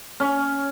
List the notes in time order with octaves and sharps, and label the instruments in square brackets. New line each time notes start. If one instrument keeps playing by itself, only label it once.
[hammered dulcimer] C#4